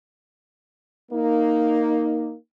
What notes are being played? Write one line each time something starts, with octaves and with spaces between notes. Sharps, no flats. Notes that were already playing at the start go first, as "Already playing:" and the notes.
A#3 D#4